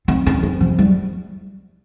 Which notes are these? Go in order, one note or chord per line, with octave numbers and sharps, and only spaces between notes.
C4
C#4
C4
F3
G3